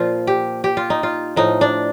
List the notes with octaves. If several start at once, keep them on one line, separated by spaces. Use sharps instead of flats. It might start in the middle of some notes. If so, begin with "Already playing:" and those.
Already playing: A#2 F3 F4
G4
G4
F4
D#4
F4
A2 F3 D#4
D4